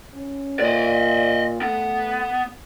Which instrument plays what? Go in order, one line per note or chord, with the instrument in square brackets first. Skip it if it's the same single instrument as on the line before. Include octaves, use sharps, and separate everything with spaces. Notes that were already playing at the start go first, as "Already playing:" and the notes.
[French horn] C#4
[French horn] A#2 [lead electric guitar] D5 D#5
[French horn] A3 [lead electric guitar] B3